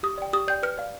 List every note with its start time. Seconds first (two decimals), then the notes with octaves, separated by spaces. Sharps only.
0.03 G4 D#6
0.18 D5 G5
0.33 G4 D#6
0.48 D5 G5 G6
0.63 B4 F6
0.78 D5 F5